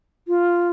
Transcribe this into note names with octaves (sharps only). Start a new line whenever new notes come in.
F4